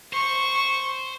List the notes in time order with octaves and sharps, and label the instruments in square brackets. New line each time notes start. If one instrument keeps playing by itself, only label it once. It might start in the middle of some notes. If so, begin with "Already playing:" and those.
[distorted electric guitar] C5 [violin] C#6